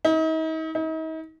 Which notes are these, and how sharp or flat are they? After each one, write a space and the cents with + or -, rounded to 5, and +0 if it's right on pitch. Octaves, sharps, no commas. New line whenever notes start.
D#4 +40
D#4 +40